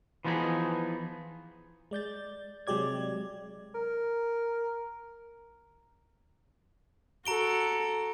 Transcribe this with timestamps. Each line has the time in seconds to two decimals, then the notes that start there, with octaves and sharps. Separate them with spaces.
0.25 E3 F3 B3 D#4 G#4
1.91 G#3 D5 G6 A6
2.67 C3 F#3 G#3 G4 D5 G#6
3.75 A#4
7.25 F#4 A4 A#5 D7 G7